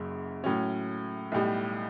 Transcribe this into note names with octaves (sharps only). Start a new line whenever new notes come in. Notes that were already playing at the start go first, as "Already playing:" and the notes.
Already playing: F#1 F#2 C#3
A2 F#3 C#4
B1 A2 G3